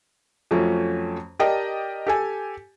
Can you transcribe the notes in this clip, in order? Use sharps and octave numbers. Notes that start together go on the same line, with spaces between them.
F2 F3 F#3 A3 C#4
G4 A#4 D5 D#5 G5 A5
G4 A4 G#5